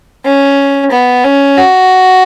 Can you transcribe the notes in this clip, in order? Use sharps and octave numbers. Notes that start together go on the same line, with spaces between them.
C#4
B3
C#4
F#4